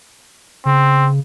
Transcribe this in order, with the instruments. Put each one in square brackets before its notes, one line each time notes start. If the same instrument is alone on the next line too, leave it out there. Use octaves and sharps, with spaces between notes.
[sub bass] C#3 [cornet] C4